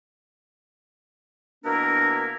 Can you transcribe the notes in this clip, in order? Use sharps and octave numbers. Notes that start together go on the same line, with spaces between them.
B2 A#3 D4 E4 A#4